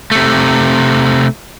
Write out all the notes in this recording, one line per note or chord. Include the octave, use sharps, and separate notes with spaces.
C3 A3